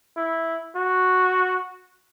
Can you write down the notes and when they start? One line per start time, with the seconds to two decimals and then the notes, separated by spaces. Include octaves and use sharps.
0.17 E4
0.76 F#4